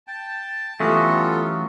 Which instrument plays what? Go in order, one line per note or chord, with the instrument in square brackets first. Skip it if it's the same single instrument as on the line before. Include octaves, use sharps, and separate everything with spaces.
[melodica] G5 [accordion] A5
[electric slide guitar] E3 F#3 C#4 [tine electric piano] A3 G4 [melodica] B3 F4 A4